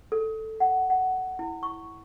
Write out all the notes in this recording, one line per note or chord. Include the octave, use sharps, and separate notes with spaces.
A4
F#5
F#5
E4
C#6